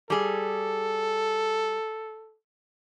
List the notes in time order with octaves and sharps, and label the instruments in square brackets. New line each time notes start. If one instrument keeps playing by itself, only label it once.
[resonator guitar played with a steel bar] G3 G#4 [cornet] A4